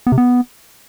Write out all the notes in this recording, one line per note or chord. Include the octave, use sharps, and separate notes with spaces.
B3
C3
B3